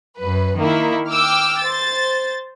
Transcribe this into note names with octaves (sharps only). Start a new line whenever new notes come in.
F#2 B4
D#3 A#3 E4
G5 D6 E6 F6
C5 A6